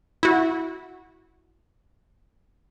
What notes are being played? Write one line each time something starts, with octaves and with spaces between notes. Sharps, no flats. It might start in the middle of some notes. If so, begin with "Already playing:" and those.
E4 F#4